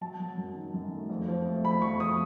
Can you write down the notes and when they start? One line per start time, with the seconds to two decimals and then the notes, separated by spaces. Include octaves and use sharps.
0.01 F#3 A5
0.20 F#3
0.37 F#2
0.55 D#3
0.74 F#2
0.92 A3
1.10 F2
1.28 F3
1.46 A3
1.64 F2 B5
1.82 F2 C#6
2.00 F3 D#6